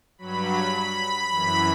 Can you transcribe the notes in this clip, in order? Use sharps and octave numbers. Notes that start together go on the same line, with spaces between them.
G2 F#3 B5
B5
F#2 E3